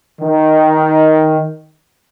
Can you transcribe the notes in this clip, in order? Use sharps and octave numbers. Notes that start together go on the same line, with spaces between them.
D#3